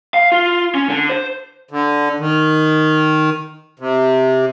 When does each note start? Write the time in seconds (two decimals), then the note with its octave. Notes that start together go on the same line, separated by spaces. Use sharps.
0.14 F5
0.32 F4
0.75 C#4
0.89 D3
1.09 C5
1.71 D3
2.20 D#3
3.80 C3